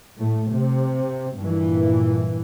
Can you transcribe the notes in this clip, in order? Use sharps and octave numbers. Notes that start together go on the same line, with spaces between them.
A2 A3
C3
G2 A#2 E3